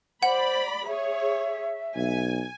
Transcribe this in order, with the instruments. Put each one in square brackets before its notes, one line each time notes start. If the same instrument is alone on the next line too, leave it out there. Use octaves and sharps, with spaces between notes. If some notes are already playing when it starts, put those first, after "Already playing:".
[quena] C5 [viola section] D5 B5 [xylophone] F#5
[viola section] G#4 C#5 [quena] E5
[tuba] B1 [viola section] G#5